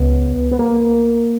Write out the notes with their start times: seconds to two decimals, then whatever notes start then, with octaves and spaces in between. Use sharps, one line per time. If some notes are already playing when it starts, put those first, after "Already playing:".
Already playing: C#2 C#3 B3
0.51 B3
0.59 A#3